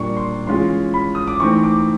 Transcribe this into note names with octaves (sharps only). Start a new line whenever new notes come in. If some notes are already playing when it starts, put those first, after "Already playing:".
Already playing: A#2 G3 A#3 D4 C#6
C6
E3 G#3 C#4 F4 C6
B5
D#6
D6
E3 A3 C4 D#4 C#6
D6